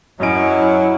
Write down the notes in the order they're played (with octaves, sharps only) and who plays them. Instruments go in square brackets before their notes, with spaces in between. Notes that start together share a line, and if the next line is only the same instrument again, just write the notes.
[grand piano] F#2 D#5 D7 [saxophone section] F#3 C#4 [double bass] E4